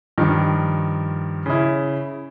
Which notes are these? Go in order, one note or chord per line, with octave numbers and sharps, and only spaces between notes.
G2 D#3 F3
C#3 E4